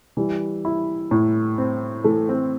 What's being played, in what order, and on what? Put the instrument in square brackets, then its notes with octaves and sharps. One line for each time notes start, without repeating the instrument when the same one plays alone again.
[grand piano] E3 [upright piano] G3
[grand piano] E4
A2
C4
[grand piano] E3 [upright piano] A3
[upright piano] C4